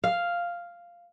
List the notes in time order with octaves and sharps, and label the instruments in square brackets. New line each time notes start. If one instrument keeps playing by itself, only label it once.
[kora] F5